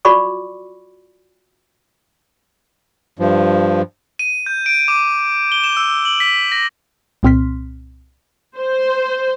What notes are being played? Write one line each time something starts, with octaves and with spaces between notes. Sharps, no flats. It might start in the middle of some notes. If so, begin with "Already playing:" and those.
F4 F#4 D5 B5 C#6 D6
G2 F3
D#7
G6
D7
D6
G7
E7
E6
F#7
B6
A#6
C2 A#2 C4 C6 F6 B6
C5